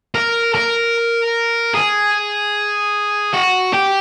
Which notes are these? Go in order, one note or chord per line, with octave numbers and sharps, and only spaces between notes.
A#4
A#4
G#4
F#4
G4